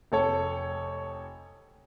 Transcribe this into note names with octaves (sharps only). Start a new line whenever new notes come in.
F1 A4 C#5